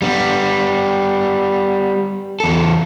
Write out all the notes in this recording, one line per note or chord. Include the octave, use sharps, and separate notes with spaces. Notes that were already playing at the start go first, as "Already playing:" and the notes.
G3 B3
E2 A4